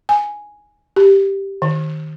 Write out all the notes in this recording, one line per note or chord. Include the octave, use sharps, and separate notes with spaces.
G#5
G4
D#3